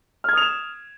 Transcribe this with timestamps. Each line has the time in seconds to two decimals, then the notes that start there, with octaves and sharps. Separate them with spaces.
0.24 F6
0.29 G#6
0.33 D#6
0.37 F7
0.42 E7